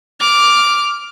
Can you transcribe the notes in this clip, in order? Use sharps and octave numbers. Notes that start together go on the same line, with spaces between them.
D6 F6